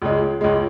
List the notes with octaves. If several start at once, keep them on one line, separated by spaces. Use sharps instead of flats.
C#2 C#3 G#3
C#2 C#3 G#3